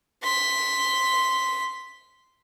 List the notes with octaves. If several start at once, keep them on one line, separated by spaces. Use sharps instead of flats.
C6 B6